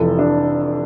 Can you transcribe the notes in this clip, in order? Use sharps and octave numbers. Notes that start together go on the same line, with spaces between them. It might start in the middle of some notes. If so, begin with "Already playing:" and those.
Already playing: F1 F2 E3 A4
D4